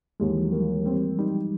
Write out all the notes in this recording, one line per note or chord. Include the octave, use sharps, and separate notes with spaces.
D#2 G#3
E3
F3
F#3
G3 A#3
G3 C4
G3 D#4